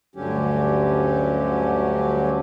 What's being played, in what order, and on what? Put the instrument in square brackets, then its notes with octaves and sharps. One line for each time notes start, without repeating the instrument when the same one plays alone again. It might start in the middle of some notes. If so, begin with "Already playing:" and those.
[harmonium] D2 G2 D3 F#3 C#4 G4